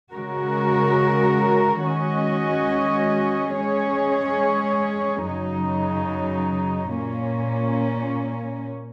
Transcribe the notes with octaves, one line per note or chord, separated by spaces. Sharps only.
C#3 G#3 F#4 A#4
D#3 G#3 C#4 F#4 D#5
G#3 C#4 G#4 C#5
F#2 C#3 F#3 D#4
A#2 A#3 C#4